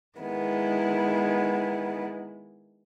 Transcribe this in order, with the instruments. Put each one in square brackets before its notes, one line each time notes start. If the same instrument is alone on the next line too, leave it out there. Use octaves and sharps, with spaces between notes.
[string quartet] D#3 G#3 B3 E4